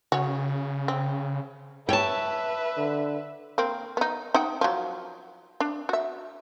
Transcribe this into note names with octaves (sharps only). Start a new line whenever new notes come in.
C#3 F#4 C#5
C4
A4 B4 C#5 E5 G5 A5
D3
A#3 C4
B3 D#4
D#4 F#5 G5
F3 F#3
D4
F#4 E5